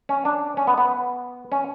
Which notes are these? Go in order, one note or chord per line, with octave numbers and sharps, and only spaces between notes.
C#4
D4
C#4
B3
B3
C#4